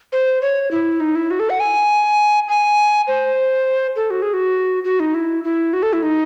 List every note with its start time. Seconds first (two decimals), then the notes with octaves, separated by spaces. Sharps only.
0.12 C5
0.42 C#5
0.71 E4
1.00 D#4
1.15 E4
1.31 F#4
1.40 A4
1.50 F#5
1.60 G#5
2.48 G#5
3.07 C5
3.96 A4
4.10 F#4
4.22 G#4
4.34 F#4
4.84 F#4
5.00 D#4
5.14 E4
5.44 E4
5.73 F#4
5.83 A4
5.93 E4
6.03 D#4